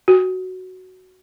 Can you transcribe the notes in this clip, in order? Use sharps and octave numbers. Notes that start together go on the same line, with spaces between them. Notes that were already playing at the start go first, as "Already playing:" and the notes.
F#4